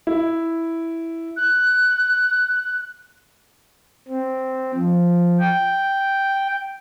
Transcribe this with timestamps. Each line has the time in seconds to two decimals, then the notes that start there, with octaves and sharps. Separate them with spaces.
0.07 E4
1.37 F#6
4.08 C4
4.75 F3
5.40 G5